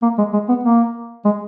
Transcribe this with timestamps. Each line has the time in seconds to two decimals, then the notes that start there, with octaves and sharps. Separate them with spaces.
0.03 A#3
0.18 G#3
0.33 G#3
0.49 B3
0.64 A#3
1.25 G#3